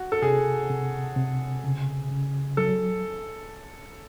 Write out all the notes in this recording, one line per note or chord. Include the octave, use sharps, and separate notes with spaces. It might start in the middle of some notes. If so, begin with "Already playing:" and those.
Already playing: F#4
A4
C3 G#4
C3
C3
C#3
C#3
F#3 A4